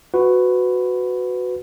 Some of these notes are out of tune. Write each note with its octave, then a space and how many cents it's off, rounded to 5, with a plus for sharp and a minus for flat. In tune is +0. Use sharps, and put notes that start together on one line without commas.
F#4 -5 B4 +15